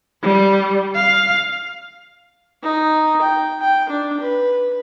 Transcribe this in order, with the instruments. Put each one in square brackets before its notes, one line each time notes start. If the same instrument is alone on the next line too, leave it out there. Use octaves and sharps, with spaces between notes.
[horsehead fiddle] G3
F5
[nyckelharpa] D#4
G5
G5
D4
B4